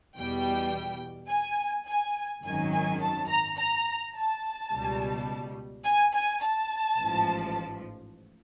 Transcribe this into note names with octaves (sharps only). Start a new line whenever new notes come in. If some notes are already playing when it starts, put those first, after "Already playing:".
E2 B2 G3 G5
G#5
G#5
G#1 F#2 D#3 F#3 G#5
G#5
A5
A#5
A#5
A5
C#2 B2 G3
G#5
G#5
A5
A1 G#2 F3